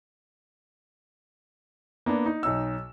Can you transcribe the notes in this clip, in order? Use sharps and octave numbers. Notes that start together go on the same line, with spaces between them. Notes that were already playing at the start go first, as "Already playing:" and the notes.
A#3 B3 D4
D#4
B1 D#4 C#5 E6